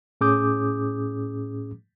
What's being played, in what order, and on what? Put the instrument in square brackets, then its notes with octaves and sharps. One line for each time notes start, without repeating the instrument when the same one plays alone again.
[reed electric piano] A2 C#4 G#4 D6 D#6 G6